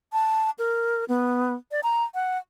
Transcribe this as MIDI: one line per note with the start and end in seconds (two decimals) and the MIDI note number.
0.13 0.50 81
0.59 1.05 70
1.09 1.54 59
1.72 1.81 74
1.83 2.04 82
2.15 2.38 78